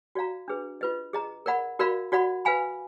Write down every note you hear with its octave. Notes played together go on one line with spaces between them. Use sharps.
F#4 D5 F5 A#5
D4 G#4 B4
F4 B4 D#5
G#4 D#5 A#5
A#4 D5 F#5 B5
F#4 A#4 D5 F5 B5
F#4 D5 F#5 B5
B4 F5 G#5 B5